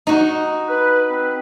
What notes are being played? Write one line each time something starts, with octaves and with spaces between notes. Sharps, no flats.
D#4 F#4
B4
C4 B4